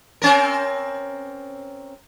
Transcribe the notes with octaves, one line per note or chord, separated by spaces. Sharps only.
C4 C#4 A#4